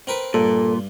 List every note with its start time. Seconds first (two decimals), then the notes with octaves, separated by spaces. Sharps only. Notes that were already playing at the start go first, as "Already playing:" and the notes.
0.07 C4 A#4 B4
0.34 G2 A#2 A4